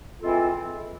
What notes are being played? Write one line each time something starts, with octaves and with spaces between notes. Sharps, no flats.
E3 G#3 C4 F4 A4